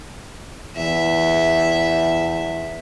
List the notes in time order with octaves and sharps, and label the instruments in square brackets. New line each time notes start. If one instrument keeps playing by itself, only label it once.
[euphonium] E2 [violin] E5